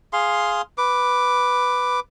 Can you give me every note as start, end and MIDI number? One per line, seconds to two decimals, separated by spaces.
0.13 0.62 68
0.13 0.62 77
0.13 0.62 84
0.78 2.00 71
0.78 2.00 86